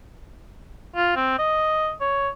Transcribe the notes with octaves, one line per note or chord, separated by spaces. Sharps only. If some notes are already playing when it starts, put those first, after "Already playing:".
F4
C4
D#5
C#5